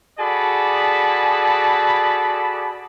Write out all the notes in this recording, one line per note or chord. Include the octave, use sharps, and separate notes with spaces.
F#4 G#4 A4 D5 A5 B5